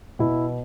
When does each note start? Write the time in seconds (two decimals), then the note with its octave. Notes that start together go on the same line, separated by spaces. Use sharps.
0.19 B2 E4